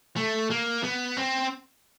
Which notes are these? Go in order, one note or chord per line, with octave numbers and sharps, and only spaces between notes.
A3
A#3
B3
C4